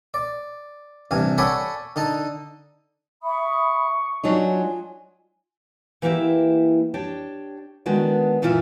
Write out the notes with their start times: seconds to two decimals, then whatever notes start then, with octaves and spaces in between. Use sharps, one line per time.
0.14 D5
1.11 A1 G2 C3 G#5
1.38 A4 C#5 D5 F#5 G#5 B5
1.96 D3 D#4 A5
3.24 E5 B5 C#6 D#6
4.24 F#3 D4 D#4 F4 G#5
6.02 E3 A#3 E4 G4 E5
6.94 D4 G4 C#5 G5
7.86 D#3 G#3 B3 D4 F#4 D5
8.42 F#2 A#2 E3 F4 D5 E5